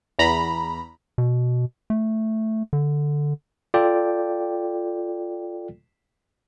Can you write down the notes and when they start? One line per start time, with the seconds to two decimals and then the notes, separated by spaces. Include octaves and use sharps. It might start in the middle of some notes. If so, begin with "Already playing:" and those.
0.19 E2 A#5 B5
1.18 B2
1.90 A3
2.73 D3
3.74 F4 A4 D5 G5